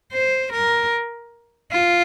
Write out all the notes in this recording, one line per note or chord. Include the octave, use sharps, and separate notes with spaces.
C5
A#4
F4